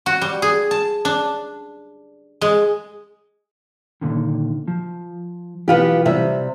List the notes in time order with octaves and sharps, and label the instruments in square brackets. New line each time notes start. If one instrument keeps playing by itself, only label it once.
[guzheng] F#4
G3
G#4
A5
D4
G#3
[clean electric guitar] A#2 D3 D#3
F3
[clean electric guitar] B1 E3 [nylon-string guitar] B3 F4 G4
[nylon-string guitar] C3 G3 E5